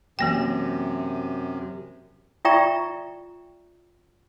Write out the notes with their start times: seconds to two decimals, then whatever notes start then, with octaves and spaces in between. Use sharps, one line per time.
0.19 F#2 C3 E3 A#3 G5
2.45 F4 D5 E5 G5 A#5 C#6